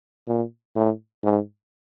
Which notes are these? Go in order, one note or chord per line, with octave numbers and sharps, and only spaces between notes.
A#2
A2
G#2